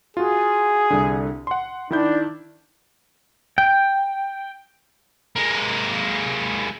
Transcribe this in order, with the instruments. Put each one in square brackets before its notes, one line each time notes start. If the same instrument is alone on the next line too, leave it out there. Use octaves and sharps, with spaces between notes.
[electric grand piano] F4 F#4 [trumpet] G#4
[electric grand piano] C2 D3
F#5 C6
[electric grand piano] D#3 E4 G6 [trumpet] D4
[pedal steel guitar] G5
[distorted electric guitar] G#3 A#3